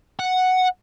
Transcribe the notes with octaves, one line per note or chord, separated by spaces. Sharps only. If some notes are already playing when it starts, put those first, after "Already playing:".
F#5